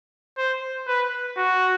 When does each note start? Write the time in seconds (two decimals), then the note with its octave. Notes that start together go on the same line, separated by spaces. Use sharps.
0.38 C5
0.87 B4
1.37 F#4